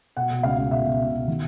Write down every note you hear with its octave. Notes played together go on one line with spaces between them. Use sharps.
B2 F#5
B2
C#2 F5
C#2
B2 E5
B2
C#2
B2
D#3